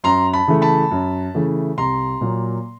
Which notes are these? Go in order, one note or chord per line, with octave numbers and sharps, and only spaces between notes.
F#2 A#5 C6
A5 B5
C#3 E3 A3
A5 B5
F#2
C#3 E3 A3
C2 A#5 C6
A#2 F#3 A#3